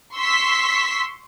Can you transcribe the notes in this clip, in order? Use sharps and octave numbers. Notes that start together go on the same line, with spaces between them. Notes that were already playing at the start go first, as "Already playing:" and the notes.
C6 C#6 E6 B6